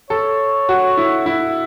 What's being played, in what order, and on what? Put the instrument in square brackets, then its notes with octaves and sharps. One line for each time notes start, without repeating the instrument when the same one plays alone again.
[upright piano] A4 [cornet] C#5
[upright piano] F#4
E4
E4